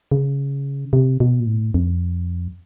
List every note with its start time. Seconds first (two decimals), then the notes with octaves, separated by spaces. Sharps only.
0.12 C#3
0.93 C3
1.20 B2
1.40 A#2
1.47 A2
1.74 F2